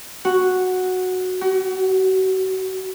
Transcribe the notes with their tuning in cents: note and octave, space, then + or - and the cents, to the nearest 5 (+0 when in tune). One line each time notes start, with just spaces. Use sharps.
F#4 -5
F#4 +35